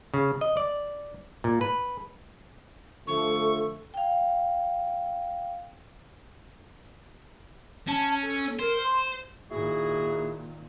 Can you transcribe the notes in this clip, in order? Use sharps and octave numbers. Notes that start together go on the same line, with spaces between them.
C#3
D#5
D5
A#2
B4
D3 F3 A3 A4 C#6
F5 G5
C#4 A5
A4
A#4 C5
C6
A#2 D#3 E4 F#4 G#4